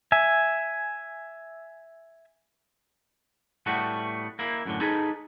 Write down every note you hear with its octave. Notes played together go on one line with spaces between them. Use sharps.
E5 G#5
A2 G3 A3 B3 F#4
A#3 E4
F#2 A2 D3
D#4 G#4 A4 B4